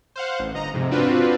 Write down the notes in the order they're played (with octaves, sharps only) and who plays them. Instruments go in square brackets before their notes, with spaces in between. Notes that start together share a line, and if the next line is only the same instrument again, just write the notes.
[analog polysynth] C5 F5 F#5
A1
G1 D#5 A#5
F2 G#2 C3
C4 D4 F4 F#4 B4